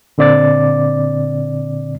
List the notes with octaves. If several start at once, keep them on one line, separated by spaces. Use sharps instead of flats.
A#2 D3 C4 D5 D6 A6